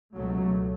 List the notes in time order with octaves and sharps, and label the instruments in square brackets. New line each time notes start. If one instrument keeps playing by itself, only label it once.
[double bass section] C#2 B2 F#3 A3